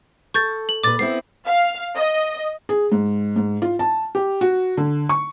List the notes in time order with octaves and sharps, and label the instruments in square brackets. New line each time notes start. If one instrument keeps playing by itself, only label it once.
[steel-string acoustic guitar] A4 [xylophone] C#6 G6 A6
[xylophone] F#7
[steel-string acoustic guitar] A#2 B4 [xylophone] D6 A6
[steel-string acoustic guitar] B3 C4 E4 [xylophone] C7
[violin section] F5
D#5
[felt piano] G#4
G#2
G#2
F4
A5
G4
F#4
D3
C#6